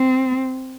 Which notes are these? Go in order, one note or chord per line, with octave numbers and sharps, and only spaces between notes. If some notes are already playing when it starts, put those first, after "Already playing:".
Already playing: C4